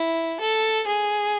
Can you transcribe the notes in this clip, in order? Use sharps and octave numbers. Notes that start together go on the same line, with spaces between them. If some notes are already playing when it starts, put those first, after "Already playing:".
Already playing: E4
A4
G#4